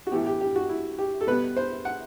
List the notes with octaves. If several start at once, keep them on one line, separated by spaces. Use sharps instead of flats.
F#4
A2 E3 B3 G4
G4
G4
F#4
E4
G4
A4
B2 G3 B3 B4
C5
F#5